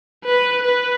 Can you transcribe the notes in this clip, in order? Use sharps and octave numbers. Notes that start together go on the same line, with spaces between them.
B4
B4